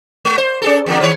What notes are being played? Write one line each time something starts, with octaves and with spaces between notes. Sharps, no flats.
G#3
C5
C#4 G#4 A4
E2 D3 A#3
D#3 G#3 C#5